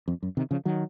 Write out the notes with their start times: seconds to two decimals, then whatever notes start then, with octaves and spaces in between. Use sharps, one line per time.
0.08 F2
0.23 F#2
0.37 C3 D#3
0.51 C#3 F3
0.65 D#3 F#3